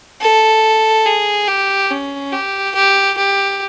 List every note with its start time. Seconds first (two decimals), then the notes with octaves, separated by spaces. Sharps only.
0.21 A4
1.05 G#4
1.48 G4
1.91 C#4
2.32 G4
2.75 G4
3.17 G4